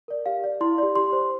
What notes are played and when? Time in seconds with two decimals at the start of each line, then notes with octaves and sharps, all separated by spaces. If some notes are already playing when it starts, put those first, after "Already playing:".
0.08 A#4 D5
0.26 G4 F5
0.44 D5
0.61 E4 C6
0.78 G4 D5
0.96 G4 C6
1.12 C5